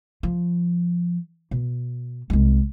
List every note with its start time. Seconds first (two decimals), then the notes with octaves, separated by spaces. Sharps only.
0.23 F3
1.51 B2
2.30 C2 G#3